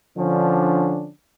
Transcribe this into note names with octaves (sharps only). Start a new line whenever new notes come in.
D3 F3 C#4 D4